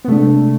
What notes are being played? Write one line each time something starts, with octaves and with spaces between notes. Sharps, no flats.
B3
C3 G#3 A3 D4